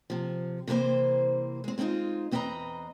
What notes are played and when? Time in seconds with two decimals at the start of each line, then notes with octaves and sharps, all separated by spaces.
0.10 C3 F3
0.68 C3 E3 A#3 C4 C5
1.64 G#3 C4
1.78 G#3 C4 D4 D#4 F4
2.31 E2 C4 B4 D5 D#5 A#5